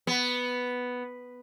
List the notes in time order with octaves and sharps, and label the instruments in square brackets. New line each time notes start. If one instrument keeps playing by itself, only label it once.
[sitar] B3